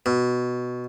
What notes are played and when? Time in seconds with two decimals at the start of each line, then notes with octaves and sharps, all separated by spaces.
0.06 B2